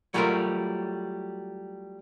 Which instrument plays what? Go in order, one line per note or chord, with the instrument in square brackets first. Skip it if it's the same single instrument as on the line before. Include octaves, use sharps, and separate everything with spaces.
[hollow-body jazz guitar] F#3 G3 A3 F4 A#4